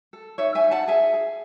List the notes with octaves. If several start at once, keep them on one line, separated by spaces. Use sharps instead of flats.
A4
D#4 C#5 E5
E5 G#5
D#4
F#5 A5
G#4 E5 G#5
G#4